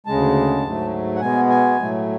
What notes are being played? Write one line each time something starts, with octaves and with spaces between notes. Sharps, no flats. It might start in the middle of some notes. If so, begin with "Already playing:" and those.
D2 C#3 G#3 A5
G#2 F#3 A3
F#5
B2 G#3 B3 G#5
G#5
A2 F#3 A3